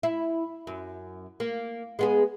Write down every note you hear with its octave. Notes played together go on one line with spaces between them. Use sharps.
E4
F#2
A#3
G#3 B3 G#4